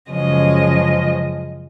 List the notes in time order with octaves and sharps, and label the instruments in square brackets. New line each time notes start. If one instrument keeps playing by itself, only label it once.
[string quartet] F#2 C#3 F3 G#3 D#5